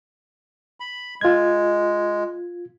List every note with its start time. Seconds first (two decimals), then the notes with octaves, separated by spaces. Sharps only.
0.80 B5
1.21 G#3 F4 G#6